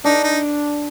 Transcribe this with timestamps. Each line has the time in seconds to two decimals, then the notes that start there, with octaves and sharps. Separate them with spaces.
0.04 D4 D#4
0.24 D#4